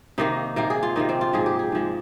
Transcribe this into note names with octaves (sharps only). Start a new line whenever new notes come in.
C3 D#3 A#3 D#4
C3 D#3 A#3 A#4
G#4
F4
C3 D#3 A#3 D#4
C4
F4
G#2 F3 G#3 G#4
G4
G#4
G#2 F3 G#3